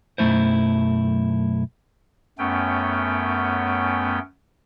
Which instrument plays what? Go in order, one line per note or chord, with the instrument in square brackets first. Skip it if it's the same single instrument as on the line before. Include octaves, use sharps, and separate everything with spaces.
[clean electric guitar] B1 F#2 B2 A3 E4 C5
[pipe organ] F#2 A3 B3 C#4 G5